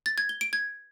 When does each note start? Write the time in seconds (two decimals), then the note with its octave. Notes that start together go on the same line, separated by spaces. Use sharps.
0.06 A6
0.18 G#6
0.29 G7
0.41 D7
0.53 G#6